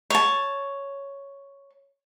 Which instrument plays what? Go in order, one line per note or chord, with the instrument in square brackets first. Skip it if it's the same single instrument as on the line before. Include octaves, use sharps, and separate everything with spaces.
[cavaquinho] C#5 A5